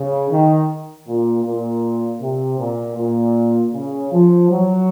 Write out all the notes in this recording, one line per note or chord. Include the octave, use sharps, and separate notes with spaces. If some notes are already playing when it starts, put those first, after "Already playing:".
Already playing: C#3
D#3
A#2
A#2
C3
A#2
A#2
C#3
F3
F#3